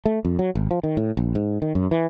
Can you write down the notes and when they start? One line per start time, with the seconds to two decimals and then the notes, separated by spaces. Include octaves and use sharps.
0.06 A3
0.25 F2
0.39 F#3
0.55 G#1
0.71 F3
0.83 D#3
0.97 A2
1.17 A#1
1.35 G#2
1.62 D#3
1.75 F#2
1.91 E3